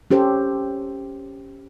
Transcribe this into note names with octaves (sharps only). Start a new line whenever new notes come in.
C#4 G4 A4 C5